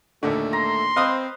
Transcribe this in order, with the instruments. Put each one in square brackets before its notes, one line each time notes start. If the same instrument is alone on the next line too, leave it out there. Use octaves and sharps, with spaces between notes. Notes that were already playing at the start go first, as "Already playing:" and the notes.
[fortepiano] D#2 A#2 D3 [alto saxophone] A3
[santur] A#5 [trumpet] C6
[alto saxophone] C4 [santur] B4 C5 [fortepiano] D#5 F5 D#6